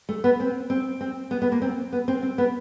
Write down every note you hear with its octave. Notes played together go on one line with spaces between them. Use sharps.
A3
B3
C4
C4
C4
B3
B3
A#3
C4
B3
C4
C4
B3